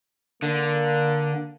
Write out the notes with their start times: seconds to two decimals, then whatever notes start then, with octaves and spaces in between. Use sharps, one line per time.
0.43 D3 A#3